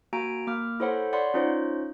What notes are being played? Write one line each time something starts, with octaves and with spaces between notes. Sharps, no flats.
A#3 F#4 G#5 A#5 D7
A#3 D6 F6
E4 A4 C5 C#5 F#5 B5
C#5 D5 F#5 B5 C6
C#4 D#4 F4 C5 C#5